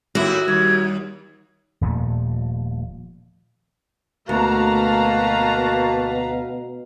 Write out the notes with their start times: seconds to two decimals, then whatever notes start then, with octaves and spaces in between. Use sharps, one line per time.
0.15 D#2 A2 E4 F#4 E5
0.48 D#2 G3 G#6
1.81 D#1 A#2 F3 A3
4.29 D2 B2 A#3 F#4 B4 F5 A5 A#5